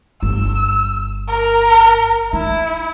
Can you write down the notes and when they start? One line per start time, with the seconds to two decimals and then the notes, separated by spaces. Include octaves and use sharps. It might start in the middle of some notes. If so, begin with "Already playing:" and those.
0.22 G1 E6
1.28 A#4
2.33 D#4 E4